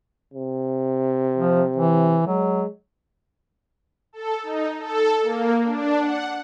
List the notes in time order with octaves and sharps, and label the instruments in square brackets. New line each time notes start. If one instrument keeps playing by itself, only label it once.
[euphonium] C3
[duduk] F3
E3
[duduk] F#3 [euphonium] G#3
[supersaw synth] A4
D#4
A4
A#3
D4
F#5